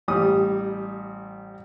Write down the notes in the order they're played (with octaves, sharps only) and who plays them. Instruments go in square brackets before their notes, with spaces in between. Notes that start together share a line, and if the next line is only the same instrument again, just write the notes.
[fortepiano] A1 G3 D#6